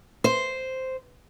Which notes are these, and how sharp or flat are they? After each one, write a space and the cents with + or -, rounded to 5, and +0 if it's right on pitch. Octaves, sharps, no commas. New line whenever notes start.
C5 -5